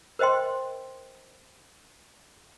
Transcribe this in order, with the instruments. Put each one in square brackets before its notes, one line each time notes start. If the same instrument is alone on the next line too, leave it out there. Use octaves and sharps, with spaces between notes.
[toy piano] A#4 C5 D#5 G5 C6